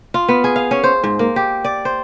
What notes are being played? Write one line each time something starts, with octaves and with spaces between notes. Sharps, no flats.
F4
B3
G#4
F5
C#4
C5
G#2
A#3
G4
D5
C5